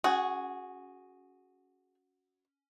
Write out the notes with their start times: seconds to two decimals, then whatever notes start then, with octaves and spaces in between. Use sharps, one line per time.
0.04 C#4 F#4 G#4